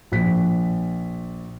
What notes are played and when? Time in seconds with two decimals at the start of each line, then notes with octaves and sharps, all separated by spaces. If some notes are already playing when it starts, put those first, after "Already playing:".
0.12 A#1 B6